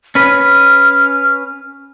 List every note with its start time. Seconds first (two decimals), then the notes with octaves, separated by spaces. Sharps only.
0.15 C#4 B4 F6